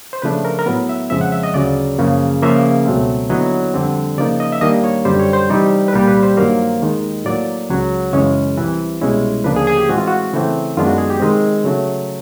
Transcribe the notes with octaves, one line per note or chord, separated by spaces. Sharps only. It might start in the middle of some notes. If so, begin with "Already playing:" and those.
C5
C#3 F3 A3 D4 B4
A#4
A#4
A2 F#3 B3 B4
E5
F2 C#3 F3 G#3 E5
F#5
E5
D#5
D2 C#3 F#3 D5
F#2 C#3 F3 A#3
C#3 F3 A#3 E5
C#2 B2 F#3 A3 C4
D#2 D3 F#3 B3 E4 D#5
F2 D3 G3 C4
C#3 F3 A#3 D#4 D5
D#5
E5
D#2 D#3 G3 A#3 D4 D#5
C#5
F#2 D3 G3 C5
C#5
C5
C3 E3 G3 C4 D#4
B4
C2 A#2 G3 A#3 A#4
B4
C5
G2 D#3 F#3 A#3
D#2 D#3 G#3
A2 F#3 A#3 D5
C#2 C#3 F#3
F#2 C#3 E3 G#3 C#4 C#5
C2 C3 E3
C2 B2 G#3 C#4 E4
D2 C#3 F3 A#3 D4 B4
G#4
G#4
G4
A2 E3 G#3 C4 F#4
F4
F#4
C#3 E3 A3 C4
F#2 D#3 G#3 B3 D4 F4
F#4
G#4
G4
C3 D#3 G#3 C4
C#3 F#3 A3